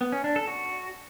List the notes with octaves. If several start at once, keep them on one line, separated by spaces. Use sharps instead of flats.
B3
C#4
D4
A4
F#4